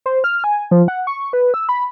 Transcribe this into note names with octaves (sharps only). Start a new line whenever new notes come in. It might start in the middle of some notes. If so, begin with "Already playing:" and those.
C5
F6
G#5
F3
F#5
C#6
B4
E6
B5